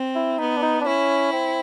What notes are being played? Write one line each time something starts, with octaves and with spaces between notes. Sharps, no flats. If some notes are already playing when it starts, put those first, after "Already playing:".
Already playing: C4
E4
B3 D#4
D4
D#4
D4
C#4 E4
C4